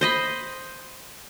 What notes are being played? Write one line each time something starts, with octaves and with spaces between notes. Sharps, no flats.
C5 D#5 B5